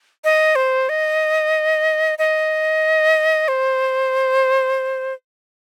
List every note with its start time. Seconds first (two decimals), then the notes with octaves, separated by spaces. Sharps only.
0.24 D#5
0.56 C5
0.89 D#5
2.19 D#5
3.48 C5